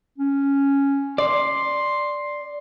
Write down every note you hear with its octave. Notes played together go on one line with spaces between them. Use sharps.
C#4
D5 C6